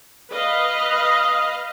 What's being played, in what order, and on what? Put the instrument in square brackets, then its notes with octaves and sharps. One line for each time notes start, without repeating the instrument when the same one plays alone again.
[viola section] B4 D#5 F5